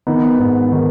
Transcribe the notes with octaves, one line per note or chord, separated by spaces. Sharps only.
D#3 B3 D#4
G#2
D#3